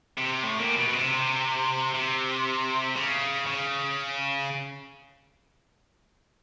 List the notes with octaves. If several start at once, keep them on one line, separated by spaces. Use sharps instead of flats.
C3
A2
A#2
B2
B2
C3
C3
C#3
C#3